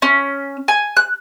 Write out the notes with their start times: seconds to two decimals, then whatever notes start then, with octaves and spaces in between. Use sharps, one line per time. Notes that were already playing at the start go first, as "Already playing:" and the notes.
0.02 C#4
0.68 G#5
0.97 F#6